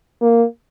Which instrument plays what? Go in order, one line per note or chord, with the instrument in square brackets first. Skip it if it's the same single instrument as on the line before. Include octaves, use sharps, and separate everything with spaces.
[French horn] A#3